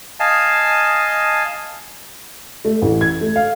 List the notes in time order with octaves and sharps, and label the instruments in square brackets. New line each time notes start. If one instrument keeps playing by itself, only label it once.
[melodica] D#5 F5 G#5 A5
[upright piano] A3
A1
G#6
A3
F5